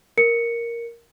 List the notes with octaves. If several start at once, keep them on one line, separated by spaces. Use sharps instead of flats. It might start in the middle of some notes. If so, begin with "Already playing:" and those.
A#4 C#7